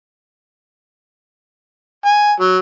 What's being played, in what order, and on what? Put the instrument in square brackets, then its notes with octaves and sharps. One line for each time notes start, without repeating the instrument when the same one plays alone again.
[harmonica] G#5
F#3